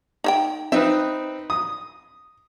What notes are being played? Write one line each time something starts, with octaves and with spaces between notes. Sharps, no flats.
D#4 E5 G5
C4 D#4 B4 E5
D#6